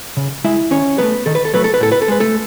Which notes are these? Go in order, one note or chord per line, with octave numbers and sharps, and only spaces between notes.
C#3
G#3 E4 E5
D#3 C#4 C#5
F#3 A3 B3 B4
D#3 A4
B4
A4
F#3 A3 B4
A4
B4
A2 A4
B4
A4
G#3 B4
A3 A4